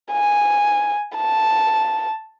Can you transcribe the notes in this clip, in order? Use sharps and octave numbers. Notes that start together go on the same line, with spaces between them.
G#5
A5